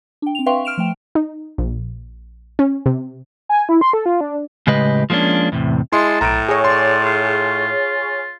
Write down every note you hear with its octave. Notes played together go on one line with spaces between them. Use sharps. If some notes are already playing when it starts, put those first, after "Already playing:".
D4 G5
C4 F7
B4 E5 F5 G5 C6 C#6
F6 D7 E7 F7
F3 A3 G5
D#4
A#1
C#4
C3
G#5
E4
C6
A4
F4
D4
A2 C#3 G#3 G4 B4 D#5
F3 G#3 A#3 C#4 D4
E2 A2 C3
G#3 E4 A5 C6
B1 A2 A#5 D7
G#4 C#5 D#5
D5 C6
F4